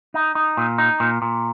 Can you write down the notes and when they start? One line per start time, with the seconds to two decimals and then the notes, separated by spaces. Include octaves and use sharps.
0.14 D#4
0.35 D#4
0.57 A#2
0.78 D#4
1.00 A#2
1.22 A#2